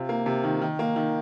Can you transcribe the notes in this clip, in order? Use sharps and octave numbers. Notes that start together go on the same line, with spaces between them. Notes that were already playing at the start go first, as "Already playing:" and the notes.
Already playing: C3 F4
A#3
C3
D#3
D#3
A#3
D#3